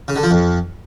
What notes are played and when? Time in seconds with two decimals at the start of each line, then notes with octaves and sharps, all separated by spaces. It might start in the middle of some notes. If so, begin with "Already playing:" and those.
0.08 C#3
0.16 D3
0.23 F3
0.31 F2